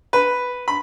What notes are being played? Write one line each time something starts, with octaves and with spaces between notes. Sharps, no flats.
B4
B5